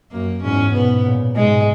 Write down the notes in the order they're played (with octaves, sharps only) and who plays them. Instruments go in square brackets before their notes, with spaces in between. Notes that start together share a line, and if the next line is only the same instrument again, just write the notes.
[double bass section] F#2 [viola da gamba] A#3
[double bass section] E2 G#2 [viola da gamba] C#4
[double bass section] G#2 B2 [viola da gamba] B3
[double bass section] A#2 C#3
[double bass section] G#2 B2 [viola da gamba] G#3